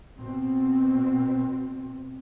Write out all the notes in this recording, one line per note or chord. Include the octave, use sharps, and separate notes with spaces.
B2 C4